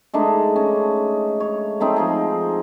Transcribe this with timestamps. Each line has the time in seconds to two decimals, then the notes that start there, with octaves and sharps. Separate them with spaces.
0.13 G#3 A3 D4 D#4
0.56 C#4
1.40 C#5
1.80 A3 C4 D#4
1.96 F3 D#4 G#4